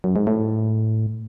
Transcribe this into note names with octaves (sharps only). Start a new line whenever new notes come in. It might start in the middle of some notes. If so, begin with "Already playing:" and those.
F#2
G#2
A2